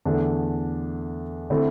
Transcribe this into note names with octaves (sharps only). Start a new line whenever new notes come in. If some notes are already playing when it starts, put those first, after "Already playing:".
E2 D3 A3 D4
D3 A3 C4 E4